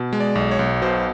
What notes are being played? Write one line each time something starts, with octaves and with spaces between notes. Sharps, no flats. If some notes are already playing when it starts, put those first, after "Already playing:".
Already playing: B2
G#3
D5
B1
C#5
B1
B2 C5